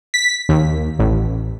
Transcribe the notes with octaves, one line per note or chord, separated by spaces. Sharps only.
B6
D#2
A1